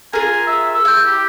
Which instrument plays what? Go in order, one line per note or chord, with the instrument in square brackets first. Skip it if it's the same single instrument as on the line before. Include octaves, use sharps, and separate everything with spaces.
[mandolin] F4 G#4 A#4 [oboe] G#5
[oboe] E5
E6
[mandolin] E4 G6
[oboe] G4